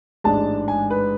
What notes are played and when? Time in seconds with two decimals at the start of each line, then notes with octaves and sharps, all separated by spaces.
0.24 A1 G#2 G#3 D4 A5
0.68 G#5
0.90 B4